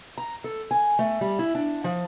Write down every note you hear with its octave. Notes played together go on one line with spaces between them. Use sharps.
A#5
A4
G#5
A3
G3
E4
D4
F3